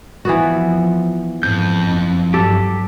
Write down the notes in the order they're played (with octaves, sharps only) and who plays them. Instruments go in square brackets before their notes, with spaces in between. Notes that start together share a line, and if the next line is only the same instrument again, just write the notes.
[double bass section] F2 F3 [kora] E3 B3 F#4
[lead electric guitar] F2 [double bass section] G#2 [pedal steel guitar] G6
[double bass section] F#1
[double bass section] G2 F#3 [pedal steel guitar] G4 [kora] A4